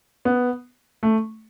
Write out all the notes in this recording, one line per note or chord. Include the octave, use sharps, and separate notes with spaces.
B3
A3